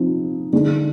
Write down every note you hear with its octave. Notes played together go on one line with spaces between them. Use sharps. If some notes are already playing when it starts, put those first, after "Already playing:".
Already playing: C3 F3 C4 D#4
D3 G#3 D#4